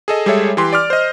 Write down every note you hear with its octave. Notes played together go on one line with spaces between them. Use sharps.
G#4 A4 D#5
G3 G#3 G#4 A4 C#5 E5
E3 G4 B4 C6
D5 D6 F6
C5 D#5